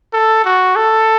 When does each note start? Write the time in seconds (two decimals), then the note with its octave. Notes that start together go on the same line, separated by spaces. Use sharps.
0.13 A4
0.45 F#4
0.76 A4